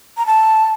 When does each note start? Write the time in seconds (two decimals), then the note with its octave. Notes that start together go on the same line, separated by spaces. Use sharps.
0.17 A#5
0.26 A5